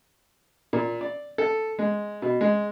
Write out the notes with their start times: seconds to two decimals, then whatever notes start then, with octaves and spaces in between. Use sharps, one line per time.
0.73 A#2
1.01 D5
1.38 A4
1.79 G#3
2.22 B2
2.41 G#3